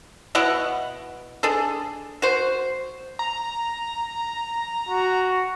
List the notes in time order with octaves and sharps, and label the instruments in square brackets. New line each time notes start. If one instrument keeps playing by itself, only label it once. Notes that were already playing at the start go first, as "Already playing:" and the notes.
[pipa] B2 E4 D#5 F#5
D4 G#4 A4
F#4 C5
[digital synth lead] A#5
[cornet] F#4